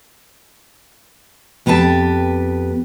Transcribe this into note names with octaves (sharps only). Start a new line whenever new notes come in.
F2 B3 G4 B4 A5